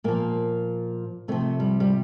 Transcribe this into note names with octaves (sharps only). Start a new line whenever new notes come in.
A#2 F3 A#3
C3 F3 A3
G3
G3